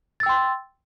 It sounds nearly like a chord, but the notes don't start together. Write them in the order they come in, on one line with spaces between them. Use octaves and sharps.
A6 E6 G5 C6